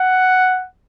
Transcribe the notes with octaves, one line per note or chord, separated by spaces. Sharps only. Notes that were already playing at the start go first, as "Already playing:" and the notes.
Already playing: F#5